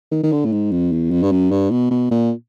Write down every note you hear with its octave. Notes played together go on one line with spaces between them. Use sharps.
D#3
D#3
D3
A2
G#2
F2
E2
F2
G2
F#2
G2
B2
B2
A#2